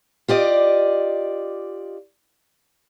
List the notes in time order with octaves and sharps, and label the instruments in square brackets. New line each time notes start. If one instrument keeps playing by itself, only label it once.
[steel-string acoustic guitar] F4 G4 D5 D#5